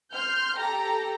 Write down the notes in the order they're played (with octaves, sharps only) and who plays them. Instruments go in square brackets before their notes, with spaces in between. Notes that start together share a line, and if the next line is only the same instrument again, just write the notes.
[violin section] C6 F6 G6
G4 A4 A#5